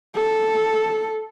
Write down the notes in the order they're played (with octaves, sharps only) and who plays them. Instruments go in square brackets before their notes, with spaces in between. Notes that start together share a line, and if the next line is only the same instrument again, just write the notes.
[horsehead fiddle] A4